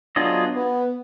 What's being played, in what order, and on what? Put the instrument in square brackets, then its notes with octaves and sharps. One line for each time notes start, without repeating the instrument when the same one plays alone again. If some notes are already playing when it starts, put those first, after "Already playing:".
[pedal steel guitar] F#3 B3 F4 G#4 D#5 [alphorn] D4
[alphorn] B3